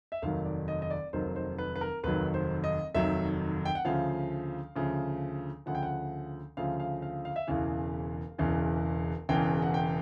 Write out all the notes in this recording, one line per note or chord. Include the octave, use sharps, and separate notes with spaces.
E5
F1 D#2 D#3 F#3 F5
D5
D#5
D#5
D5
F1 D#2 D#3 F#3 C5
C5
B4
B4
A#4
F1 D#2 D#3 F#3 B4
C5
D#5
F1 D#2 D#3 F#3 E5
G5
F#5
D2 C#3 F3 F5
D2 C#3 F3
D2 C#3 F3 F#5
G5
F#5
D2 C#3 F3 F5
F5
F5
F5
E5
E1 E2 C#3 E3 F5
E1 E2 C#3 E3
E1 E2 C#3 E3 G5
F#5
G5